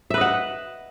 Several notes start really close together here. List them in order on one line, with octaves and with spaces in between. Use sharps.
E5 B4 D#5 F#5